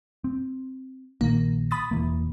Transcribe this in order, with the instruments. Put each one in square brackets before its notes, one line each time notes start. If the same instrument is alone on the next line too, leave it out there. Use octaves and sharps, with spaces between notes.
[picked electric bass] C4
[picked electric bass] A#1 D#3 [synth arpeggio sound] A#3
[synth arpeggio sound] B5 D#6 A6
[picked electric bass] E1 E3 A#3